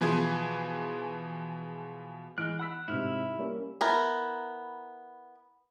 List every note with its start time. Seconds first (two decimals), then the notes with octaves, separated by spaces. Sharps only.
0.01 B2 E3 F3 G#4
2.38 E3 G#3 F6 F#6 D7
2.59 F#5 B5 E6 F#6 B6
2.88 G#2 C3 E4 F6
3.38 G3 A#3 C#4
3.81 B3 E4 A#4